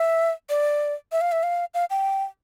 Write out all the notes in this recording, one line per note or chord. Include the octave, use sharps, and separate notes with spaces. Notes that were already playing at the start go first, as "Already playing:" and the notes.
Already playing: E5
D5
E5
F5
E5
F5
F5
G5